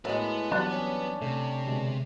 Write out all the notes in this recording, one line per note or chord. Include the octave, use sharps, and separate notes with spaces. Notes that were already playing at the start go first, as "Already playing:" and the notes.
A2 G#3 B3 F#4 A#4 B4 E5
E3 F#3 G3 D4
C#4
C3 A3
B2 D3 G#3